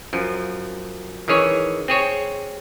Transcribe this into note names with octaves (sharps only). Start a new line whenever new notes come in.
F#2 F3
D#3 E3 C#4 G#4 C#5
C4 G#4 C#5